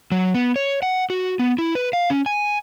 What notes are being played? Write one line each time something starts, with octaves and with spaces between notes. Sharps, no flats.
F#3
B3
C#5
F#5
F#4
B3
E4
B4
F5
C#4
G#5